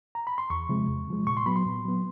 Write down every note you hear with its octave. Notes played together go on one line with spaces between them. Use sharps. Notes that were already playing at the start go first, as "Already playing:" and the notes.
A#5
B5
C6
E2 C#6
C3 F3 G#3
E2
C3 F3 G#3
A#2 C#6
C6
F#3 B3 B5
C6
A#2
F#3 B3